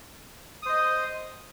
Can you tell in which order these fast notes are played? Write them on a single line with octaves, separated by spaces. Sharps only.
D#6 C5 D#5